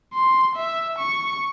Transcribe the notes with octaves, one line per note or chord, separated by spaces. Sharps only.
C6
E5
C#6